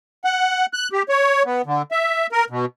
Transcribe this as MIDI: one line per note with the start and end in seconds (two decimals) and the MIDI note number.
0.24 0.66 78
0.73 0.89 90
0.93 1.03 67
1.09 1.43 73
1.45 1.62 59
1.66 1.82 50
1.92 2.27 76
2.32 2.45 70
2.50 2.65 47